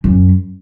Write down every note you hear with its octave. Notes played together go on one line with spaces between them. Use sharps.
F#2